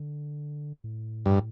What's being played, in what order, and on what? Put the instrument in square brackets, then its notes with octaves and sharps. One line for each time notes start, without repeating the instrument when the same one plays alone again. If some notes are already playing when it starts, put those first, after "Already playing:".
Already playing: [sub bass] D3
A2
[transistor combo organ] G2